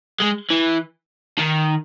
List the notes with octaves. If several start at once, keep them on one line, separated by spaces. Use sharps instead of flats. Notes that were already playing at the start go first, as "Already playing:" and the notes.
G#3
E3
D#3